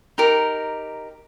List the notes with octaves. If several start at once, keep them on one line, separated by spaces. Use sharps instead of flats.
D#4 G4 A#4